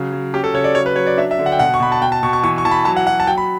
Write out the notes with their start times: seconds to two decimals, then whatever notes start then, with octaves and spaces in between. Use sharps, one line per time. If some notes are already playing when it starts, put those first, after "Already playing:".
Already playing: C#3 F#3
0.12 F#3
0.34 C#4 G4
0.44 A4
0.54 C#3 C#5
0.64 D5
0.75 F#3 C#5
0.86 B4
0.96 F#3 C#5
1.07 D5
1.17 D4 E5
1.31 E5
1.39 D3
1.46 F#5
1.52 G5
1.59 B2 F#5
1.74 C#6
1.80 B2 B5
1.92 A5
2.01 B2 G5
2.12 A5
2.23 B2 C#6
2.33 C#6
2.43 E3 C#6
2.58 C#6
2.65 E3 A5
2.71 B5
2.85 F#3 A5
2.96 F#5
3.07 F#3 F#5
3.20 A5
3.27 F#3 G5
3.38 B5